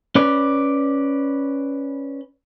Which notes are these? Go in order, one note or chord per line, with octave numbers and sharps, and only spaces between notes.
C#4 B4 D5